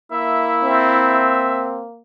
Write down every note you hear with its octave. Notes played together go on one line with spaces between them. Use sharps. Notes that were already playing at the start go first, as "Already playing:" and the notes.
A#3 E4 E5
C4